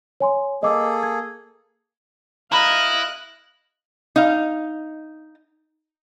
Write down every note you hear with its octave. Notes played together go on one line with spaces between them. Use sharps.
C#5 G#5 C6
A#3 G#4 A4 D#5 D6 E6
G#6
E4 D#5 F5 A#5 B5 F#6
D#4 F5